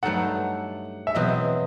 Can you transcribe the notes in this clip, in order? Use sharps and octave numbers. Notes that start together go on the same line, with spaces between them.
G2 F#3 A3 D#4 A4 F#5
E5
E2 B2 F#3 C4 D#5